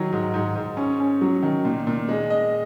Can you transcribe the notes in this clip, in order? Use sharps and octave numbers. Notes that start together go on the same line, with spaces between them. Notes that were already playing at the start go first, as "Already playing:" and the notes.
Already playing: D#3 F#3
G#2
G#2
G#2
C#4
C#4
F#3
D#3
A#2
A#2
G#3
D#5